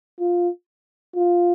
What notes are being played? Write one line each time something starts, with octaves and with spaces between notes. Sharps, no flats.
F4
F4